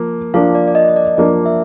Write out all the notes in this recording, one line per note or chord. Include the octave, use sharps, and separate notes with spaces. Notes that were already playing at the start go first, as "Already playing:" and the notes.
Already playing: F3 A#3
F3 A#3 D4 F5
D5
D5
D#5
D#5
D5
F3 A#3 D4 D5
E5